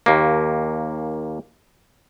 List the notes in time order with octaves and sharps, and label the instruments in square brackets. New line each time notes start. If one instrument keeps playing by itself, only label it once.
[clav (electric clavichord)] D#2 A#3